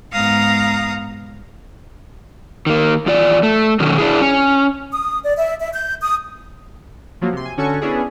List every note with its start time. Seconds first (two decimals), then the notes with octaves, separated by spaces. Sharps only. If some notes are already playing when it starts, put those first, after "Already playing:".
0.12 G#2 B3 F5 A#5 D#6 A#6
2.66 D#3 A#3
3.06 E2 F4 D5
3.43 A3
3.80 B2 D3 D#3 F#3 C#4
3.98 D4 E4 G#4
4.22 C#4
4.92 D#6
5.24 D5
5.37 E5
5.59 E5
5.73 G6
6.01 D#6
7.21 F3 F#3 A#3
7.33 C3 C6
7.45 G#5
7.57 D3 C#4 F#4 A4 G#5 C#6
7.81 B3 C#4 D4 E4 G#4